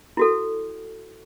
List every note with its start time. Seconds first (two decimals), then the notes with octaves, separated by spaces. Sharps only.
0.17 E4 F#4 A4